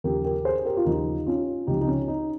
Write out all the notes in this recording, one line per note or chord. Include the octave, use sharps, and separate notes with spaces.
D#2 C#3 F3 G4 A#4
G4 A#4
G#4 C5
C5
G4 A#4
F4
D#2 C#3 F3 D#4 G4
C#4 F4
C#2 C3 F3 D#4 G4
D#4
C#4
D#4